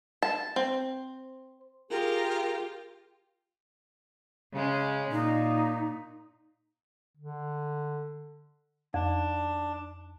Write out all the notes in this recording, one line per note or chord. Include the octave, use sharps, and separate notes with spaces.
A5
C4
F4 G4 G#4 A#4
C#3 G#3 C#4
A#2 D#4
D3
F2 D4